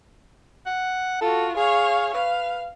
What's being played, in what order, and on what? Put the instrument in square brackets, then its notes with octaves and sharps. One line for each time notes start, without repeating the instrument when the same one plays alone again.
[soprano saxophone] F#5
[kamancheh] F4 F#4 [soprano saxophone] A4
[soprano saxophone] G#4 [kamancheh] C#5 F5
[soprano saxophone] B4 [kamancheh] F5